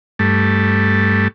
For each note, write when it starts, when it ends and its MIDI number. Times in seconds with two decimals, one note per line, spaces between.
0.19 1.28 43
0.19 1.28 57